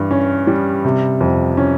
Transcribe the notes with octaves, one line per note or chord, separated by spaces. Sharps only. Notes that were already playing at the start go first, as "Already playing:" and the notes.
Already playing: G2 E3
C#4
G3
C3
F2
C#4